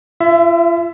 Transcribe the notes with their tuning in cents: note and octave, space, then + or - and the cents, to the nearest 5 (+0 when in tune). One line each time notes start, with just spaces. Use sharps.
F4 -40 E5 +20